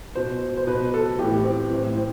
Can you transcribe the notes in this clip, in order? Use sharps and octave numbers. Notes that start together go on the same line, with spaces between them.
B2 C5
C5
B2 B4
A4
A2 G4
E3
C4
A2 E3
C4